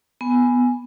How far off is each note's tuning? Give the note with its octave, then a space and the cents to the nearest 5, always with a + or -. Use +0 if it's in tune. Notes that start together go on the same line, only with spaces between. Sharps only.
B3 +0 G#5 +0